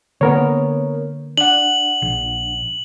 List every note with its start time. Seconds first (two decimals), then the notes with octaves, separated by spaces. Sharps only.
0.21 D3 A#3 B3 A#4 C#5
1.37 D4 F#5 F#7
2.02 A#1